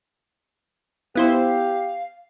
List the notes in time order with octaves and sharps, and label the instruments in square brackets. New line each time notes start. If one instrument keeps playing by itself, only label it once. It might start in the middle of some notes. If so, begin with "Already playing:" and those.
[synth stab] B3 E4 C5 [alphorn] G4 [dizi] F5